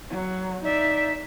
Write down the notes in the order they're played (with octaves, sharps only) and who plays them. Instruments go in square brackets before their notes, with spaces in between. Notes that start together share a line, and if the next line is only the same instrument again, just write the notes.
[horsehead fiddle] F#3
[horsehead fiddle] D#4 E5 [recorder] D5